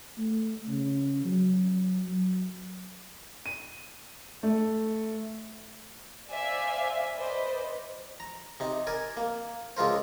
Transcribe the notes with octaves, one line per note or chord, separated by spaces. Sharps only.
A3
C#3
F#3
F#3
D#7
A3
C5 D5 E5 F5 G#5
B4 C5 D5 D#5
A#5
C3 D#4
A#4 D5 G#5
A#3
C#2 G#3 F4 A#4 C5